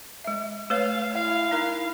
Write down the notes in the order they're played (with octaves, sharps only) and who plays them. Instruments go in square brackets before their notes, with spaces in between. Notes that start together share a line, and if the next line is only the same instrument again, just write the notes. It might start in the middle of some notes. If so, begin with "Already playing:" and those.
[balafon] G#3 E5
[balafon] A3 B4 C#5 [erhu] F5
[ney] E4 [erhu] F5
[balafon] D#4 A#4